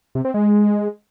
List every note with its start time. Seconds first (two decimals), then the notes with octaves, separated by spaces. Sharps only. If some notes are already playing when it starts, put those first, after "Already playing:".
0.15 C3
0.25 C4
0.34 G#3